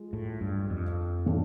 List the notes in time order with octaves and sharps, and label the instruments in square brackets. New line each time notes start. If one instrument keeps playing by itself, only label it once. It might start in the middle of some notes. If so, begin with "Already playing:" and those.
Already playing: [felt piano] F3 G#3
[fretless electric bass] A2
G2
F2
[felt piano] A2 E3 A3 D4